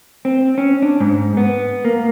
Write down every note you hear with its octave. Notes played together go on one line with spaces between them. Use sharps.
C4
C#4
D4
G#2
B3
A#3